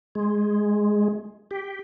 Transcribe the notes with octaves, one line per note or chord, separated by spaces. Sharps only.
G#3
G4